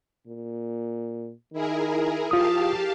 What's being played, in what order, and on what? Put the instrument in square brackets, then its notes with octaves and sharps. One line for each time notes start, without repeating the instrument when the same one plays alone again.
[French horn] A#2
[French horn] D#3 [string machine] E4 G#4 A#4
[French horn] F3 [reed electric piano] F4 D#6 [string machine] G4 F5 A5